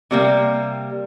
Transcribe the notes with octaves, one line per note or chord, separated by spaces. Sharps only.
C3 G3 A#3